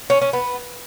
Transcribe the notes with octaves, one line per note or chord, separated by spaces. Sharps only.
C#4
C#4
B3